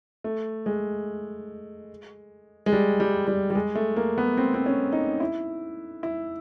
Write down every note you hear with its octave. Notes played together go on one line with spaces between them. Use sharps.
A3
G#3
G#3
G3
G3
G3
G3
G#3
A3
A#3
B3
C4
C4
C#4
D#4
E4
E4